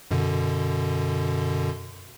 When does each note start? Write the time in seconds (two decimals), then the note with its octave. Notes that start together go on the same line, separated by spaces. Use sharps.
0.11 F#2 B2 D3